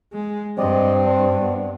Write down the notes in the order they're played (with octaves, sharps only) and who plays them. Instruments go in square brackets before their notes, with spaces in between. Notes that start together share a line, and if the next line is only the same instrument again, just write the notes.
[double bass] G#3
[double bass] G2 [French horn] C4 [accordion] D5 D#5
[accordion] D4
[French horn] B3